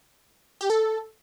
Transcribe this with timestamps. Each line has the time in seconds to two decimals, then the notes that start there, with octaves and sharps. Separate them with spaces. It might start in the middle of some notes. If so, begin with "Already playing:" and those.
0.61 G4
0.70 A4